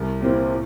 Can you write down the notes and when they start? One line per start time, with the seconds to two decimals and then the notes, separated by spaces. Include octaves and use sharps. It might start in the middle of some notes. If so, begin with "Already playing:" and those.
Already playing: C2
0.21 A#2 G3 C4 E4
0.50 A2